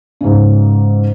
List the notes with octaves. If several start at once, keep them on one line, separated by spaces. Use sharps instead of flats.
G#2 C#3